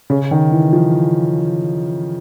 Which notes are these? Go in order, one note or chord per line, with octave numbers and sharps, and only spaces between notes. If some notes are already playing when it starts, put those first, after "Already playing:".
C#3
D#3
E3
F3